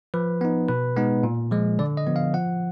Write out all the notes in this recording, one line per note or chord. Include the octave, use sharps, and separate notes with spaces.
F3 B4
B3 D#4
B2 B4
G#3 B3 D#4
A#2
F3 G#3
D3 D5
D#5
F3 B3
F5
F3 F#5